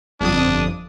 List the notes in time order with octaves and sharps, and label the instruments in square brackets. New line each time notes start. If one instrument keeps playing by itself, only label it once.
[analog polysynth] G1 F2 D#6 [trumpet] D4